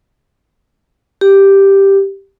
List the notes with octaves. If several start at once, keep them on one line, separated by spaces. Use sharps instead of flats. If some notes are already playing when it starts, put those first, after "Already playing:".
G4